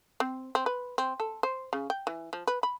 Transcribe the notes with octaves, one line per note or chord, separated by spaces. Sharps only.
C4
C4
B4
C4
A4
C5
C#3
G5
E3
F3
B4
B5